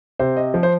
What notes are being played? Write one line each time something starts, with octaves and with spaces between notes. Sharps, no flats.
C3 C5
D#5
F3
C5